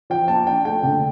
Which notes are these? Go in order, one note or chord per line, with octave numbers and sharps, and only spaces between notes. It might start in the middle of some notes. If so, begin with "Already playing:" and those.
F3 G5
A#3 A5
D4 G5
A3 G5
D3